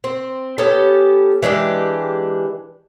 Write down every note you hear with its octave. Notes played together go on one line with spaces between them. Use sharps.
C4
B3 C#4 G4 A4
E3 G#3 D4 G4